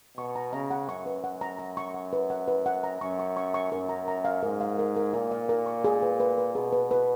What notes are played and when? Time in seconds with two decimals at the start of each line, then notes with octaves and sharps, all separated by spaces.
0.17 B2 C#6
0.36 A#5
0.53 C#3 A#5
0.71 F#5
0.88 F#2 C#6
1.06 B4
1.24 F#5
1.41 A#5
1.59 A#5
1.77 C#6
1.94 F#5
2.13 B4
2.30 F#5
2.48 B4
2.66 F#5
2.84 A#5
3.01 F#2 C#6
3.19 C#6
3.37 C#6
3.54 C#6
3.72 F#2 A#4
3.89 A#5
4.08 A#5
4.25 F5
4.43 G#2 A#4
4.61 F5
4.79 A#4
4.96 A#4
5.13 A#2 A#4
5.31 F5
5.49 A#4
5.66 C#6
5.84 G#4
6.03 B4
6.20 B4
6.38 B4
6.55 B2 G#4
6.73 B4
6.91 B4